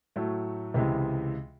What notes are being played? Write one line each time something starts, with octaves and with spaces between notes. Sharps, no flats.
A2 F#3 A3
C#2 C3 E3 G#3